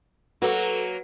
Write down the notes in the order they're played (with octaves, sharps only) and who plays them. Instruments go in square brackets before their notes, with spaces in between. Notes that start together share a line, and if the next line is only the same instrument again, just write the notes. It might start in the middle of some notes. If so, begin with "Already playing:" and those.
[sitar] F#3 A#3 [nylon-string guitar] F#4 B4 [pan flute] A4